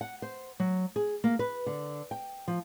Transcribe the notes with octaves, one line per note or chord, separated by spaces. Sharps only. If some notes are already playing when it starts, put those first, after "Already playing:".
F#5
C5
F#3
G#4
A#3
B4
D3
G5
F3